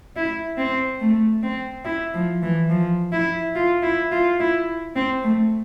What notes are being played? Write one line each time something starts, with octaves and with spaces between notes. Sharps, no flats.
E4
C4
A3
C4
E4
F3
E3
F3
E4
F4
E4
F4
E4
C4
A3